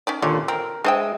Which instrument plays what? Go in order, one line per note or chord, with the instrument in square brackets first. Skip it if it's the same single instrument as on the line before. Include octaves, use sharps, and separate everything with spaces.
[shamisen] C#4 D#4 D5
[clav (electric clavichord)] D#2 A#2 D3 [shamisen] C#5
[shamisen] C4 [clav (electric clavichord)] A#4
[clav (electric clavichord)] G#3 D#5 E5 [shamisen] D4 C5 G5